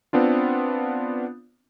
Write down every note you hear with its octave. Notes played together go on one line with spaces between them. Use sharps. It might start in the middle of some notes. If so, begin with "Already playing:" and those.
B3 C4 D4 F4